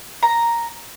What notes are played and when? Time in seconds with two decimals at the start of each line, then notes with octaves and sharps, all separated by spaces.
0.23 A#5